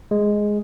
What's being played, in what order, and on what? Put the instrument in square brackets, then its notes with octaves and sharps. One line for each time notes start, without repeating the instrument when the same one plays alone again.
[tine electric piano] G#3